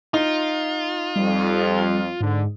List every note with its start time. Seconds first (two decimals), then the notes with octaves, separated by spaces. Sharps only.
0.14 D#4 F4
1.16 F2 G3
2.21 G#2 D3